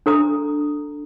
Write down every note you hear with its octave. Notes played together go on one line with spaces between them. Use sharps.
D4 A4 A#5 D#6